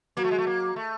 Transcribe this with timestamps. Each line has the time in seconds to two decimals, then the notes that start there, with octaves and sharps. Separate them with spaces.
0.17 F#3 A#3
0.24 A3
0.31 G#3
0.38 A3
0.47 A#3
0.76 A3